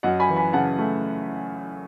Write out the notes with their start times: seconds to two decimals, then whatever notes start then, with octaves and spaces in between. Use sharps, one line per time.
0.03 F#2 D#5 F#5
0.20 G#5 B5
0.29 E3
0.36 G#5 B5
0.53 C#3 F#5 A5
0.78 A3